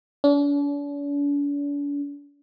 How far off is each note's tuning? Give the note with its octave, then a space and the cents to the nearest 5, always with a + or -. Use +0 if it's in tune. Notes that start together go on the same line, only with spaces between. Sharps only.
D4 -45